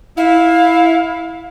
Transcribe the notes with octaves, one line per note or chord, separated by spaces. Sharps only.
E4 F5